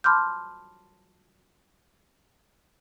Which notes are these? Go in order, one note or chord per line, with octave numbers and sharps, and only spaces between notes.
A5 B5 C6 D6 F6 G6